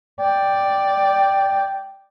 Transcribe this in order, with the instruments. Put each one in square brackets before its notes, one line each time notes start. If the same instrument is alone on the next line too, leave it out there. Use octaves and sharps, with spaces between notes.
[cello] D5 [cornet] G5